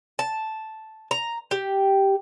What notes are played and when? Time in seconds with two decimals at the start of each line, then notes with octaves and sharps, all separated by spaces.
0.19 A5
1.11 A#5
1.51 G4